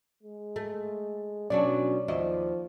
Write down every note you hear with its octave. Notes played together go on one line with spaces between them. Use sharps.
G#3
A3
B2 F#3 C#4 D4 D5
D#2 F3 E4 D#5